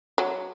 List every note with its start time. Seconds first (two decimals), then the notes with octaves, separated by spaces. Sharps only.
0.18 F#3